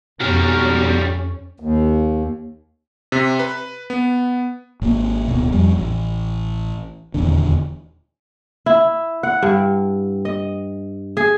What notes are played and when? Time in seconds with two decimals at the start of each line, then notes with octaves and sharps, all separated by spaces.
0.20 F2 G#2 B2 G3 C#4 F#4 A#4
1.60 D#2
3.12 C3
3.39 B4
3.90 B3
4.82 G#1 A#3
5.28 D1 B2
5.52 F2 G3
5.78 A1
7.14 D#1 E2 D3
8.66 E4
9.23 F#5
9.43 G2
10.25 D#5
11.17 G#4